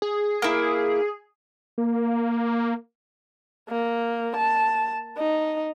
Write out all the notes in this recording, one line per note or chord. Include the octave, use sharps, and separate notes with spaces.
G#4
A#3 E4
A#3
A#3
A5
D#4